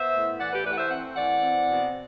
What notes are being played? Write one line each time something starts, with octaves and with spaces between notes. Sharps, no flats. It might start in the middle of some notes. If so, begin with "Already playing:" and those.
Already playing: B3 C5 E5
A2
E3 D5 F#5
G4 B4
A3 B4 D5
F#5
C5 E5
C4 F#5
E3 D5 F#5
C4
B2